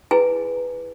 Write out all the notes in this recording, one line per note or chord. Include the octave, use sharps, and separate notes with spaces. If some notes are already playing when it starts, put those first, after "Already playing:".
E4 G#4 B4 G#5